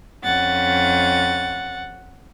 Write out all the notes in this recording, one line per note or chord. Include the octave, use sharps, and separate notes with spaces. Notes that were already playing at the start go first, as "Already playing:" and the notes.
F2 C#4 F#5 A6